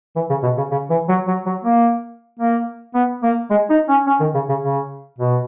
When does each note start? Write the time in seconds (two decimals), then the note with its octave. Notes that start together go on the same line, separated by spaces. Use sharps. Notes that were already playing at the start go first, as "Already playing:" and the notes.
0.16 E3
0.30 C#3
0.43 B2
0.57 C#3
0.71 C#3
0.90 E3
1.09 F#3
1.27 F#3
1.46 F#3
1.64 A#3
2.39 A#3
2.94 B3
3.23 A#3
3.50 G#3
3.70 D#4
3.89 C#4
4.07 C#4
4.20 D#3
4.34 C#3
4.49 C#3
4.62 C#3
5.19 B2